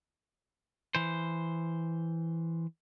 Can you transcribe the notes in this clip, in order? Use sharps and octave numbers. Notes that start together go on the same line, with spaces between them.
E3 C5